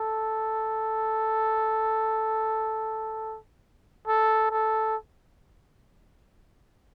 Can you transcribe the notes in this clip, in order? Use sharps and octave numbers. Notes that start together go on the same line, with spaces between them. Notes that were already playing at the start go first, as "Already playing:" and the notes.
Already playing: A4
A4
A4